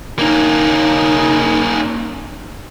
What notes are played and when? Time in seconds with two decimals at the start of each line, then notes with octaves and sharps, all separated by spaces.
0.19 A#3 C#4 D#4